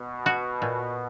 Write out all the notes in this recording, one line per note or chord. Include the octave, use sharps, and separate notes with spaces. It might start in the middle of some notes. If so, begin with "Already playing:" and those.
Already playing: B2
F#4
A#2